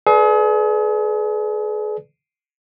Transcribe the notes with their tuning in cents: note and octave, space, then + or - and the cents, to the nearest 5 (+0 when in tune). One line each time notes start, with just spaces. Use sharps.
G#4 +40 B4 +0 D5 +0